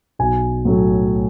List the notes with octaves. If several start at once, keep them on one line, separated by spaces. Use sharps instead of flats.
B1 G#5
A2 F#3 A3